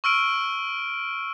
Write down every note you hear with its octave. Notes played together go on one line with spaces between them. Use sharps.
C#6 E6 F6 D7 D#7